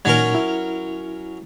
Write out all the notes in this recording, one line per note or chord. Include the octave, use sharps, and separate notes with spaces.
A#2 F#3 C#4 D#4 A#4 G#6
E4